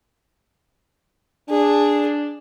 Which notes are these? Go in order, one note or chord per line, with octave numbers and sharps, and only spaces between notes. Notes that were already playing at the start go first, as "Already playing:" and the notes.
D4 G#4